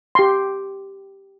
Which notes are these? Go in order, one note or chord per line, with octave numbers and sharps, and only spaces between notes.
G4 C6